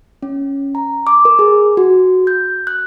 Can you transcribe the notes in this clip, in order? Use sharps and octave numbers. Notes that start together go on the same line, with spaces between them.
C#4
A#5
D6
A#4
G#4
F#4
G6
F#6